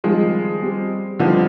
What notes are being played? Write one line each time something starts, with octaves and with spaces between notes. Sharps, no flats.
D#3 F3 G3 G#3 C4
G3 C4 G4
D3 F3 G3 C4 D#4 B4